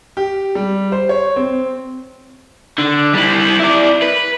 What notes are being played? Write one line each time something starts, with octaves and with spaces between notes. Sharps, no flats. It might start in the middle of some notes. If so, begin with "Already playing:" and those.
G4
G3
C5
C#5
C4
D3
G3 E4
E4 D5
B4